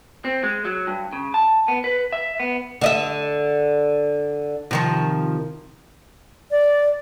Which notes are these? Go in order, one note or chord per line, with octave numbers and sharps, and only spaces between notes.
C4
G#3
F#3
G2
C#3
A5
B3
B4
E5
B3
D3 D#5 E5
C3 D#3 F3
D5